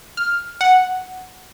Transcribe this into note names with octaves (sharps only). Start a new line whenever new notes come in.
F6
F#5